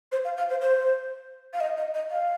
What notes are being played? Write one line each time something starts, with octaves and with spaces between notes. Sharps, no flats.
C5
F5
F5
C5
C5
F5
D#5
D#5
D#5
F5